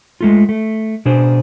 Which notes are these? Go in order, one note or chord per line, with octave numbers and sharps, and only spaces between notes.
G#3 A3 F4
A3
B2 D4 G#4 C5